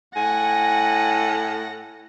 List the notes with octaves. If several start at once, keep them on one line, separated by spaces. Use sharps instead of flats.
A2 F#5 G#5 A#6